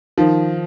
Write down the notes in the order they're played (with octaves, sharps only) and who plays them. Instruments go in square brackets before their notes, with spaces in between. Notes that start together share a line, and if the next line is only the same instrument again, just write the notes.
[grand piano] D#3 F3